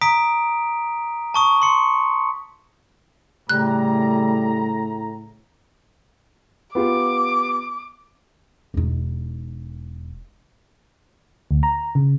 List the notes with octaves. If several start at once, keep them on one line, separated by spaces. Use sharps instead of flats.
A#5 D#6 B6 D7
A5 C#6 D#6
C6 C#7
A2 C#3 G3 A3 A#5 F#6
B3 F4 G4 D6
E1 D#4
D2
A#5
C#3